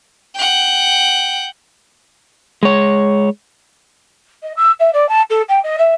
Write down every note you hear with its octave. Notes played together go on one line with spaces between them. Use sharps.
F#5 G5
G#3 C#5
D#5
E6
E5
D5
A5
A4
G5
D#5
E5